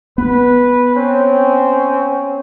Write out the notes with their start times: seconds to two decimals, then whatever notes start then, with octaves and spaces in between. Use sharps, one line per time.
0.18 B3 B4
0.96 C4 C#4